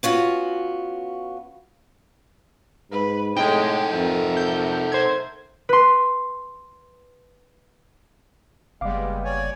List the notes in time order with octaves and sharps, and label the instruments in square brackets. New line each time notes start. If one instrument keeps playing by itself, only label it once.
[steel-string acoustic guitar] B3 C#4 F4 F#4
[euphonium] G#2 [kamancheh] B4
[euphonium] A2 [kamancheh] G#3 [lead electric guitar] D#4 A4 [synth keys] G5
[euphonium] F2 [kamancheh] A3 A#4
[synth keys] G6
C5 G#6
[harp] B4 C6
[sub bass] F#1 [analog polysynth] G3 B3 [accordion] G#3 [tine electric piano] F5 D6
[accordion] C#5 D5 G#5